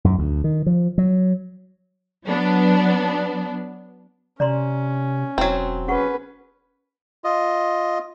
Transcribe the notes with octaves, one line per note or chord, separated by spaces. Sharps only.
F#2
D2
D#3
F3
F#3
F#3 B3 D4
C3 C#4 D5 A#5 C6
E1 F#3 C4
C#4 G#4 B4 F#5 C#6
F4 D#5